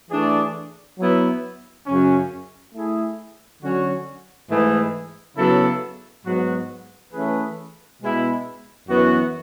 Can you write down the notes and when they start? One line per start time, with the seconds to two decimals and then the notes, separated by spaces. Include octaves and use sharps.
0.11 E3 A3 D4 G#4 D5
0.98 F#3 B3 E4
1.86 F#2 C#3 F#3 C#4
2.74 A3 E4 G#4
3.62 D3 F#3 C#4 F#4 C#5
4.49 G#2 E3 A3 E4 G#4
5.37 C#3 F#3 B3 E4 A4
6.25 G#2 F#3 B3 F#4
7.13 E3 A3 C#4 G#4 B4
8.01 B2 G#3 B3 E4
8.88 F#2 E3 B3 F#4